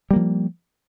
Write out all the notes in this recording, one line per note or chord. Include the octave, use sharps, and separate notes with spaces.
F3 G3 A#3